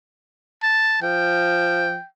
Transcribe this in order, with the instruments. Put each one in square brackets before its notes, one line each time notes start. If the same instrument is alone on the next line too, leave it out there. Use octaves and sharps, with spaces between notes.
[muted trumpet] A5
[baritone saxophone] F3 [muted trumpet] G5